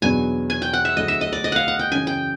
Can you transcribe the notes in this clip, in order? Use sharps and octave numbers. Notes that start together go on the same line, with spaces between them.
E2 B2 F#3 B3 D4 G#5
G#5
G5
F#5
E5
D2 D3 F#3 A3 D#5
E5
D#5
D5
D#5
F5 F#5
F#5
G5
F#2 C#3 E3 G#5
G5